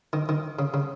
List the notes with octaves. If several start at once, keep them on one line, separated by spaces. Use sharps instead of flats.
D#3
D#3
C#3
C#3